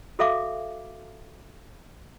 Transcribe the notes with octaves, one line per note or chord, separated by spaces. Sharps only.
F#4 A4 E5 F5 D6